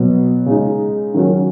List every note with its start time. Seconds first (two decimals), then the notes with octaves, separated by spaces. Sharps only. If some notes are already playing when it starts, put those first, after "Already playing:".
Already playing: B2 F#3 B3
0.46 C#3 G#3 D#4
1.14 D#3 F#3 C#4 F#4